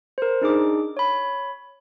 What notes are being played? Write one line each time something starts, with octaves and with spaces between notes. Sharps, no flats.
A#4 C5
D4 D#4 G#4 D6
C#5 B5